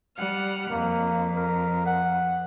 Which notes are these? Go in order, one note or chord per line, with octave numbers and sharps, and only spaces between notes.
G3 F#5 F6
F2 A#3
A#4
F#5